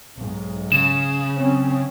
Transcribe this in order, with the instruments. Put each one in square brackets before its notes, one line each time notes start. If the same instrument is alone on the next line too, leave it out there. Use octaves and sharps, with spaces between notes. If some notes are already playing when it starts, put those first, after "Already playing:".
[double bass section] B1 G#2
[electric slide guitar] C#3 [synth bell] E7
[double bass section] F#3 C4 C#4